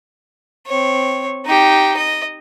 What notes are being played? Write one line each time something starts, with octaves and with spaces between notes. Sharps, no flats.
C4 C#5
D#4 G4
D#5